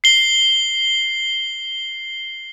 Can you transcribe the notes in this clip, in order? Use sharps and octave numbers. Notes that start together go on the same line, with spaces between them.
C7 G7